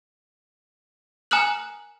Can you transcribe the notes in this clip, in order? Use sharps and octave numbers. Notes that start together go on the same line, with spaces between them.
G#5 A#5 D#6 F6 F#6 F#7